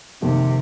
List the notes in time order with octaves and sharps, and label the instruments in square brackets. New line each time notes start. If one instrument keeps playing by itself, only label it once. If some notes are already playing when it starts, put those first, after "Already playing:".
[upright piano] F2 D#3 A#3 [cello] C3